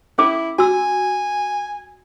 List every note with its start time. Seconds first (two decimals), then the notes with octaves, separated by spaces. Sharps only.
0.18 C#4 E4 A4 D6
0.59 F#4 G#5 E6